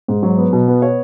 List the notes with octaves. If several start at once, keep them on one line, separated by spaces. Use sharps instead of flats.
G#2
F#3
B3
B2
B3
B3 C#5